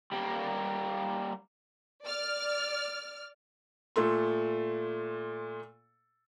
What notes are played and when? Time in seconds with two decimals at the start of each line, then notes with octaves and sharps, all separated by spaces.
0.12 G3 A#3
2.05 D5 F6
3.96 A#2 A3 A4 C6